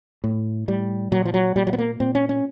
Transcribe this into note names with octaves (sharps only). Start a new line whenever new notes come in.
A2
A2 G3
A#2 F#3
F3
F#3
A#2 G3
F#3
B3
A#3
A#2 C4
C#4
C#4